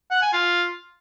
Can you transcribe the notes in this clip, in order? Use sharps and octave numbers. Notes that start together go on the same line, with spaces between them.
F#5
G#5
F4